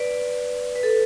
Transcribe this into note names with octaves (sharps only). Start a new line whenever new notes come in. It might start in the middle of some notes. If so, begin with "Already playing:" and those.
Already playing: B4 D5
B4
A4